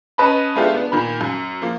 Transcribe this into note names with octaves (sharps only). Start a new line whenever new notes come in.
C#4 B4 D#5 A5 B5
G#3 A3 B3 D4 F4 G4
B3 D4
A#2 D#3 B5
F#2
F3 A#3